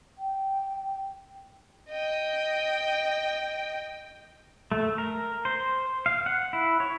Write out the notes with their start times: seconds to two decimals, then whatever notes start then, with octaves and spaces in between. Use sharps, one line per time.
0.18 G5
1.90 D#5 G5
4.72 A3
4.98 A#4
5.45 C5
6.06 F5
6.26 F#5
6.53 E4
6.80 C#5